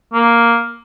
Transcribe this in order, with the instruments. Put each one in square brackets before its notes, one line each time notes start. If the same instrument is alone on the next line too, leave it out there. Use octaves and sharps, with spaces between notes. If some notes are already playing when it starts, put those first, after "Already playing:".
[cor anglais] A#3